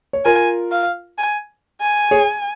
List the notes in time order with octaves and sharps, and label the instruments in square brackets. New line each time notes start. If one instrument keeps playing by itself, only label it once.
[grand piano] C#5
[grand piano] F4 A#4 [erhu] G#5
[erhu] F5
G#5
G#5
[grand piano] G#4 C#5